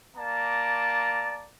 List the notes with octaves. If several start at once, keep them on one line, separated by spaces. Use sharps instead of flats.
A#3 D5 A5 A#5